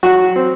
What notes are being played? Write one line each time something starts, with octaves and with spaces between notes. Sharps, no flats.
F#3 F#4
C4